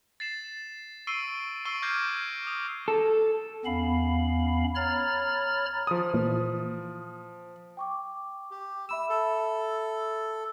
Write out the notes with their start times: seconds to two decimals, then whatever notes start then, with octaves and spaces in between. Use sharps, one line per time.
0.20 A6 C7 E7
1.07 C#6 E6 C7 D7 D#7 G7
1.65 C#6 E6 C7 D7 D#7 G7
1.82 D6 F6 G6 G#6 A#6 C7
2.47 D#6
2.88 A4
3.65 E2 B3 C#4 F5 B5
4.75 C#5 A#5 B5 F6 A6
5.87 F3 D#6
6.14 A#2 E3
7.77 G5 C#6 D6
8.51 G4
8.89 E5 B5 E6 E7
9.10 A4